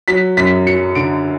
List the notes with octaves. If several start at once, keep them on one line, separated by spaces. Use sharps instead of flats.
F#3 B6
F#2 B6
F#3 C#7
D3 D7